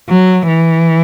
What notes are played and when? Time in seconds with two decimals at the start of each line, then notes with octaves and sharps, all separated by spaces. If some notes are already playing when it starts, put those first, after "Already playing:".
0.09 F#3
0.48 E3